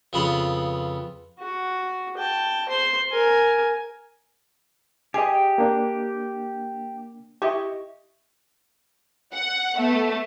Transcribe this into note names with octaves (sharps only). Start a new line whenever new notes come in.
F2 C#3 B3 F4 B4 C6
F#4
G5 A5
C5 C6
A#4 G#5
G4 G#4 D#5
A#3 D4
E4 G4 D#5 C#6
F#5
A3 B3